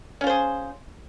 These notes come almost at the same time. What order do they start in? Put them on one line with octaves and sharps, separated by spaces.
C#4 F4 C5 G#4